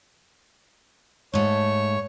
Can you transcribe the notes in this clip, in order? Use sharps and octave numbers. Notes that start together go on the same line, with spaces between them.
G#2 A3 C#5